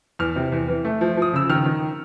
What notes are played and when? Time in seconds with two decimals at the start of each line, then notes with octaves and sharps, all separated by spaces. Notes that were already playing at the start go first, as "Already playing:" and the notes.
0.19 E2 F6
0.36 C3
0.52 E2
0.68 E3
0.85 A3
1.01 F3
1.17 F3
1.22 D#6
1.33 C#3 E6
1.50 D#3 F6
1.66 D#3